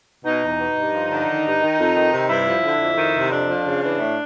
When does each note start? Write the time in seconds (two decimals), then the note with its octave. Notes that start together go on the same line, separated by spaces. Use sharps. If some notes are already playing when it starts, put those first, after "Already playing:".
0.25 B2 D#4
0.43 E2
0.59 B2
0.76 G2
0.94 F3
1.10 D3
1.28 D#3
1.45 G2
1.61 D#3
1.79 F2
1.96 D#3
2.12 C3
2.29 G2 E4
2.47 F3
2.63 D3
2.80 F2
2.97 D#3
3.15 C3
3.31 F2 D4
3.48 F3
3.66 C#3
3.83 E3 D4
3.99 A2